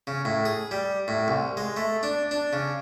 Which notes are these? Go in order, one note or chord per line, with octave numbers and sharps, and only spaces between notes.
C#3
A2
G#4
G3
A2
C2
G#3
A3
D4
D4
C#3